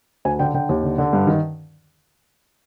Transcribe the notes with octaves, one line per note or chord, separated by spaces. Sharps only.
D2 G#5
D3 G5
D3 G5
D#2
D3
D3
G2
D#3